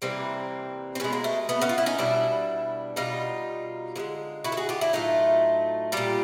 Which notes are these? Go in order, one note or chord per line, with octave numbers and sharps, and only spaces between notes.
C3 E3 G3 A#3 C4
C4
B2 G#3 B3 C#4
A#3
A3
A3 B3
B3 C#4
F4
E4
C#4 D#4
B2 G3 D4 E4
B2 G3 D#4 F4
D3 F3 G#3
E4 F#4
A4
F#4 G#4
F4 G4
D4 E4
A2 F#3 A3 D#4 F4
A#2 G3 F4 G4